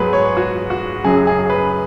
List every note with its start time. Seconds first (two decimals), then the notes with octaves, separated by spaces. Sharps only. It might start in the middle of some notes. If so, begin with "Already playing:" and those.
Already playing: G#2 F#3 B3 G#4 B4
0.13 C#5
0.37 F#4
0.70 F#4
1.04 F#2 C#3 F#3 G#4
1.27 G#4
1.50 B4